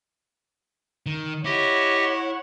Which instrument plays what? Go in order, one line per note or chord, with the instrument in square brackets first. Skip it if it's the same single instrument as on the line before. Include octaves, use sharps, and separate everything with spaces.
[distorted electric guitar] D#3
[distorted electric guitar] E4 [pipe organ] G4 D#5 [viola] C#5 F#5